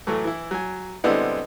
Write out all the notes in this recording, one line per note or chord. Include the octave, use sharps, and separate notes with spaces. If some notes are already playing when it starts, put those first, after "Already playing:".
A2 E3 F#3 A3
E3 E4
F#3 G#5
D3 G3 G#3 B3 C4 E4